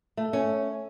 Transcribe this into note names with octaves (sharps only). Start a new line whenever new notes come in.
A3
C#4